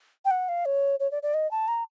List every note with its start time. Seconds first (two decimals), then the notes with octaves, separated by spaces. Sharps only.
0.25 G5
0.31 F#5
0.49 F5
0.65 C#5
1.00 C#5
1.11 D5
1.23 D5
1.34 D#5
1.51 A5
1.68 A#5